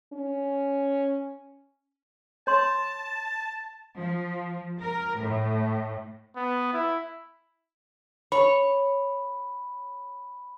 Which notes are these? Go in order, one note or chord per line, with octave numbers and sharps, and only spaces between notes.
C#4
C#5 A5 C6
F3
A#4
A2
B3
E4
C#5 B5